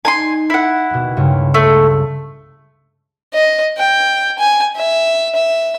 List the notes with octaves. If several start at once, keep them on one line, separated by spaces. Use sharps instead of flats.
D#4 G#5 A#5 C6
E4 F#5
D#2 B2
C#2 G2 C#3
A3
D#5
G5
G#5
E5
E5